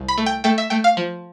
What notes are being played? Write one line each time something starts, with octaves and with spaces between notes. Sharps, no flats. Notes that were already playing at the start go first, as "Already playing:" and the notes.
Already playing: C2
B5
A3
G5
A3 G5
E5
A3 G5
F5
F3